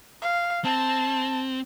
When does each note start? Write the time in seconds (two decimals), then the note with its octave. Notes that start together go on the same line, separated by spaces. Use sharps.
0.22 F5
0.65 C4 A5